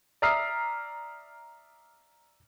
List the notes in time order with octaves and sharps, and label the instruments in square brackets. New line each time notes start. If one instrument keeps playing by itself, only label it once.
[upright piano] D5 E5 A#5 D#6 F6 C7